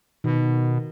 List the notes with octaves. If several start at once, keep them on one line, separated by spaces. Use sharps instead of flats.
B2 D#3